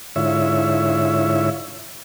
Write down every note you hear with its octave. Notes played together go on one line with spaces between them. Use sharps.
G#2 D3 E4 F4 C#5 E5